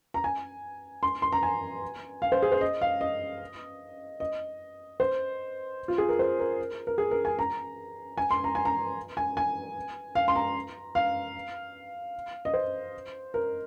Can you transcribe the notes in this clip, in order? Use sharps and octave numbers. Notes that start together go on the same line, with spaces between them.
A#5
G#5
C6
C6
A#5
G#5
F5
C5
G#4
C5
D#5
F5
D#5
D#5
C5
F4
G#4
A#4
C5
A#4
A#4
G#4
A#4
G#5
A#5
G#5
C6
A#5
G#5
A#5
G#5
G#5
F5
C6
A#5
F5
D#5
C5
A#4